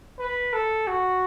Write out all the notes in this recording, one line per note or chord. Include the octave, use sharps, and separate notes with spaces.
B4
A4
F#4